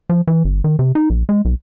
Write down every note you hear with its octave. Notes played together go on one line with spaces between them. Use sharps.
F3
E3
G1
D#3
C3
D#4
A#1
G#3
B1